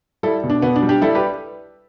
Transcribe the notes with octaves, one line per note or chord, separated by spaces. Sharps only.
G3 E4 A4
B2
D4
B2 B3
D4
G3
D4 G4
G3 E4 A4
G4 B4